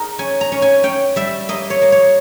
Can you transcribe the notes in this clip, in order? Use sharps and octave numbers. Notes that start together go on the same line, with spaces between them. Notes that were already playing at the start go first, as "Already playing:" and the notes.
Already playing: D#4 G#4 A#4
C#4 G#5
A#5
C#4
G#5
C#4 G5
G3 E5
A#3 D#5
C#5
A#3
C#5